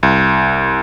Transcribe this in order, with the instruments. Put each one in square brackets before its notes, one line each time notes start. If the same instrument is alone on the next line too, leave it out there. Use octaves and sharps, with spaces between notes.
[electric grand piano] C2